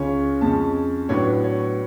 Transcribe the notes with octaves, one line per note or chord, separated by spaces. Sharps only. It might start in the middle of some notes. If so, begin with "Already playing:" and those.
Already playing: C#2 C#3 G#3 C#4 C#5
F2 F3 G#3 C#4 A5
A2 F#3 B3 D4 C#5
B4
C#5